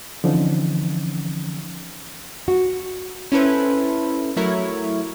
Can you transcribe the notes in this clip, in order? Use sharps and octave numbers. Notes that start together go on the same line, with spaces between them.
D3 E3 F3 C4 C#4 D#4
F#4
C#4 E4 A4 B4 C5
F#3 A3 E4 A#4 C#5